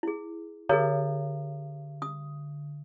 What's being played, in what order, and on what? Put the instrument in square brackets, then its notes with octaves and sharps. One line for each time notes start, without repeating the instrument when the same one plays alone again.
[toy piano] E4 G#4
[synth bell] D3 [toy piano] G#4 A#4 C#5
[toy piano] D#6